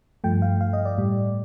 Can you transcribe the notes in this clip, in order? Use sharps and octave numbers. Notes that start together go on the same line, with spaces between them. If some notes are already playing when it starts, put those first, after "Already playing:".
G2 F3 A3 G5
F5
F5
D#5
D5
A2 G3